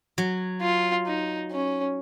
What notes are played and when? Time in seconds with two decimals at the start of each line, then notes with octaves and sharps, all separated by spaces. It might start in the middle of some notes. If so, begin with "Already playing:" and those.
0.18 F#3
0.62 F4
1.07 D#4
1.51 C#4